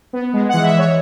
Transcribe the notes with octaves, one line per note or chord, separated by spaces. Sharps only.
B3
G#3
E3 F#5
E5
E3 C#5